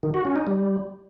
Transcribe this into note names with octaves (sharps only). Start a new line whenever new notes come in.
D#3
F#4
C#4
D#4
G3